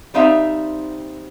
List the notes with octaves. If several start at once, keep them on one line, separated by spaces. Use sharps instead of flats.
G3 C4 D#4 E5 F5